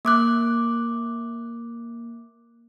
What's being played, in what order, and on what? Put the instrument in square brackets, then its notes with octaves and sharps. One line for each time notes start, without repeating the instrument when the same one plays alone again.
[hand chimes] A#3 D6 F#6